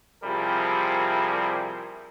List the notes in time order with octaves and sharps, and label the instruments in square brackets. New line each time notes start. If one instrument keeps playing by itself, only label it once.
[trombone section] C3 F3 G3 E4 G#4 A#4